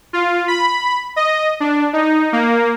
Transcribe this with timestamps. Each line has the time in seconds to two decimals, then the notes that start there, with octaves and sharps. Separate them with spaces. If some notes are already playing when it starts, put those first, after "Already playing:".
0.13 F4
0.48 B5
1.16 D#5
1.60 D4
1.93 D#4
2.33 A#3